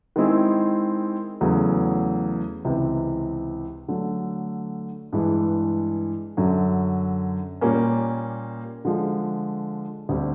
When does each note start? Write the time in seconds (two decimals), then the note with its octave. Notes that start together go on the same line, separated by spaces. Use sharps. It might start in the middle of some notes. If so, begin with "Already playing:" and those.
0.16 D#3 G#3 C4 E4 G#4
1.41 E2 C#3 F#3 A3
2.65 C#2 C3 E3
3.88 D3 F#3 A3
5.13 G2 E3 G#3
6.37 F#2 D3 F#3
7.61 A#2 G3 A#3 C#4
8.85 D3 F3 G#3
10.09 D2 D3 G3 C4